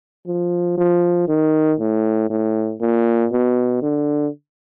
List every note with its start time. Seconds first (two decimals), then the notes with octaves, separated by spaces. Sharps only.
0.27 F3
0.78 F3
1.28 D#3
1.80 A2
2.30 A2
2.81 A#2
3.32 B2
3.82 D3